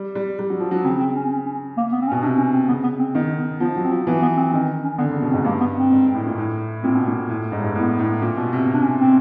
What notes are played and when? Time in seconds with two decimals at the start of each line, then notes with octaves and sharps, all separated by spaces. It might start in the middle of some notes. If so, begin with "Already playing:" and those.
Already playing: G3
0.15 G3
0.39 G3
0.50 F#3
0.60 F3
0.71 F#3
0.84 C#3 C4
1.00 C4
1.16 C#4
1.26 C4
1.31 C#4
1.46 C#4
1.77 A#3
1.92 B3
2.01 C4
2.07 C#4
2.12 B2
2.22 C3 D4
2.38 C#4
2.53 C4
2.68 C#3 B3
2.83 B3
2.99 C4
3.15 D#3 B3
3.38 B3
3.60 F3 B3
3.76 F#3
3.84 C4
3.91 F3
4.07 E3 B3
4.22 B3
4.37 C4
4.53 D#3 C4
4.84 C#4
4.98 D3 B3
5.11 C#3
5.20 B2 B3
5.30 C4
5.33 G#2
5.44 G2 A#3
5.60 B3
5.76 C4
5.91 G#2
6.14 A2
6.26 A#2
6.38 A2
6.83 A#2 C4
6.95 B2
7.07 A#2
7.29 A2
7.52 G#2
7.59 G2
7.64 G#2
7.75 A2 B3
7.99 A2
8.22 A#2
8.37 B2
8.52 C3
8.67 C3
8.74 D4
8.82 C#4
8.98 C4